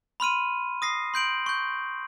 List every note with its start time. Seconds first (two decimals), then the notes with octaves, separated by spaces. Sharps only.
0.20 B5 C6 F6 D#7
0.82 D#6 A#6 C7
1.14 C6 G6 D7 F#7
1.46 C#6 G6